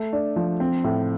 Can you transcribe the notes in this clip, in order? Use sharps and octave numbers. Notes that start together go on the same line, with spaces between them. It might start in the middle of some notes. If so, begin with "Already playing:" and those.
Already playing: A3
D4
F3
C4
A2